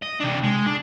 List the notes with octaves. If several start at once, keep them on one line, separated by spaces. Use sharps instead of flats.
D#5
C3 D4
G#3
D4